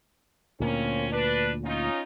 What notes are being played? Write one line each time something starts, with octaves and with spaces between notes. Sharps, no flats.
D2 A#2 A#3 C4 C#4
D4 B4
C#4 D#4 F4